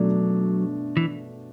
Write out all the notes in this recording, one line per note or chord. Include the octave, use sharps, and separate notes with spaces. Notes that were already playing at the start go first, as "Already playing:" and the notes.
Already playing: B2 F#3 A3 D4
E3